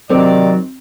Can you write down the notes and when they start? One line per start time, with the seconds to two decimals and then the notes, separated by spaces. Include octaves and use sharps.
0.10 C3 D#3 F#3 C4 D5